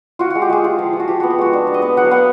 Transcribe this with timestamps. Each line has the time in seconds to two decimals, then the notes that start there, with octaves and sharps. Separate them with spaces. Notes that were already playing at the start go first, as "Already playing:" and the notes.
0.19 F4 F#4
0.30 G#3 F#4
0.42 G4
0.50 G#3 G#4
0.64 F4
0.79 F3
0.93 F3
1.00 F#4
1.08 F3 G4
1.20 B3 F#4
1.30 G4
1.38 G#3 F#4
1.53 D4
1.67 B3
1.74 D#5
1.82 B3
1.97 F#3 F#5
2.05 F5
2.11 B3 F#5